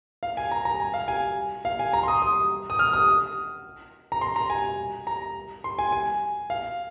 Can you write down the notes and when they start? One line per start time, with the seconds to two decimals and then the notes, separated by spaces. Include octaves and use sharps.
0.23 F5
0.37 G#5
0.51 A#5
0.65 A#5
0.80 G#5
0.94 F5
1.08 G#5
1.65 F5
1.79 G#5
1.93 A#5
2.03 C6
2.08 D#6
2.22 D#6
2.70 D#6
2.79 F6
2.93 D#6
4.12 A#5
4.21 C6
4.36 A#5
4.50 G#5
5.07 A#5
5.64 C6
5.79 G#5
5.92 G#5
6.50 F5